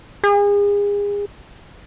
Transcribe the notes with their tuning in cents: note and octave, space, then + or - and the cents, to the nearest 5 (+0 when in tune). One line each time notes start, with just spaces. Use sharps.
G#4 -35